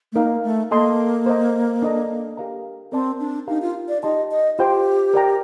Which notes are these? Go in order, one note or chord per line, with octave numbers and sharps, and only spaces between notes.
A3
A#3 D#4 A#4 F5
A3
A#3 A4 D#5 A5 C6
C5 D#5 A#5
D4 A4 D#5 A#5
G4 A#4 F5 A#5
C4 A#4 D5 A5 C6
D4
D#4 G4 A#4 F5 A#5
F4
D5
D#4 G4 D5 D#5 A5 C6
D#5
F4 G4 C5 G5 C6
A#4 D5 G5 A#5